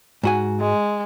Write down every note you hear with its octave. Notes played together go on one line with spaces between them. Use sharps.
G#2 F#4 G#5
G#3